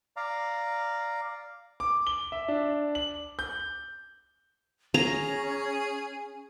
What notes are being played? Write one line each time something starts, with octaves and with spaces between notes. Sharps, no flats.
D5 F5 A#5
D6
G7
E5
D4
F#7
G6
C#4 G#4 A#5